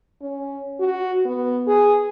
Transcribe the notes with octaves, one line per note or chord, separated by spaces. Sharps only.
C#4
F#4
B3
G#4